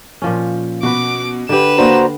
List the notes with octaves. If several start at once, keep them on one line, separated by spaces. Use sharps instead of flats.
A#2 F3 C#4
B2 F#4 B4 D6
D3 G4 B4 E7
A#3 D4 F#4 C5 A#5